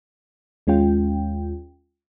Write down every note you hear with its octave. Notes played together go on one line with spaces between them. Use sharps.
D#2 G#3 C#4 F4 G5